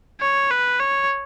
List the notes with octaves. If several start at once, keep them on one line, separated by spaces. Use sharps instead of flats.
C#5
B4
C#5